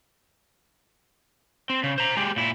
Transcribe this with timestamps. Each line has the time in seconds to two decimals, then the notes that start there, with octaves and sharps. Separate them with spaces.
1.70 C4
1.83 C#3
1.98 C5 A#5
2.17 G#3 G4
2.36 A#2 E4